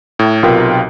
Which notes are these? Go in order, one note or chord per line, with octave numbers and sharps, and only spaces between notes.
A2
B1 C3 B3 F4 A#4 G5